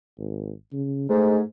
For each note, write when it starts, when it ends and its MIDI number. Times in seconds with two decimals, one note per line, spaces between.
0.18 0.52 32
0.73 1.08 49
1.09 1.38 44
1.09 1.43 57